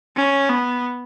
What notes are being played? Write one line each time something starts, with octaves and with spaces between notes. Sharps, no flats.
C#4
B3